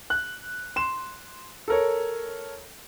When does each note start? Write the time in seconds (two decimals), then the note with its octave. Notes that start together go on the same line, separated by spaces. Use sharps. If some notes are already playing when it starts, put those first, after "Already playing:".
0.10 F#6
0.76 C6 E7
1.68 A4 A#4 C#5